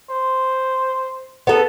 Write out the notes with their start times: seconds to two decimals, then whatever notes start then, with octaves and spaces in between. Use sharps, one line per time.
0.10 C5
1.47 B3 A4